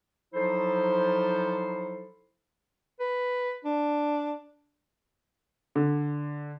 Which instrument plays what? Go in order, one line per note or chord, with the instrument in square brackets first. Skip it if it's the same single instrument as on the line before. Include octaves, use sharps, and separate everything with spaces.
[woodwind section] F3 F#3 D#4 E4 A4 C5
[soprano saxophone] B4
D4
[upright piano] D3